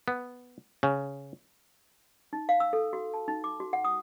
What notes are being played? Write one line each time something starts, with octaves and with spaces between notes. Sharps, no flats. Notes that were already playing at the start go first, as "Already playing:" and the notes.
B3
C#3
D#4
F5
E6
A4
F#4
A5
D#4
D6
F#4
F#5
D#6